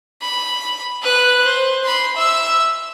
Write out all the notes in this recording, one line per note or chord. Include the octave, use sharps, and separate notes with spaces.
B5
B4 F#6
C5
B5 C6
E5 E6